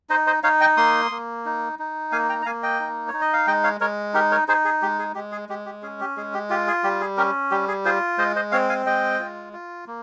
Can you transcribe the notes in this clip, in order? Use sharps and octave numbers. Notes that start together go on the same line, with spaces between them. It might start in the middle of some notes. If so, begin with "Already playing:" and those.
D#4 C5 D#5
C5 D#5
D#4 C#5 F5
D#5 G5
A#3 C6 D#6
A#3
D#4
D#4
A#3 F5 G#5
G5 A#5
A#5
A#3 F5 G#5
D#5 G5
D#4
C#5
D#4
D#5
F5
G#3 D#5 G5
C#5 F5
G#3 A#4 C#5
D#4 G4 A#4
A#4 C#5
D#4 G#4 C5
G#4
G#3 G4
G#4
G#3 G4
G#4
G#3 G4
G4
C#4 G#4
G4
G#3 G#4
G4
F4 G4
G#4
G3 G4
G#4
C#4 G4 A#4
G3 G4
G#4
F4 G#4 C5
G#3 C5 D#5
C5 D#5
C4 C#5 F5
F5 G#5
G#3 D#5 G5
F4
F4
A#3